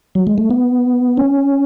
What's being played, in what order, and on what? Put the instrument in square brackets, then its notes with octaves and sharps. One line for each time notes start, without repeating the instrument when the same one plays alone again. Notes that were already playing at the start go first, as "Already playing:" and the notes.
[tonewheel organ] F#3
G#3
A3
B3
C#4